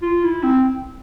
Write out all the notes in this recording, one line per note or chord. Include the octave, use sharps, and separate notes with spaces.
F4
E4
C4